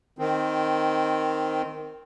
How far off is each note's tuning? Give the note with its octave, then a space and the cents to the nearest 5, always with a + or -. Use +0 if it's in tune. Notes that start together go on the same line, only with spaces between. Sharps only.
D#3 +0 C4 +0